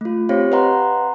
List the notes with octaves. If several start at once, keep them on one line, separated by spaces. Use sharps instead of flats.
A3 F4
C4 G4 C5 C#5 F5
B4 D#5 F#5 A#5 C6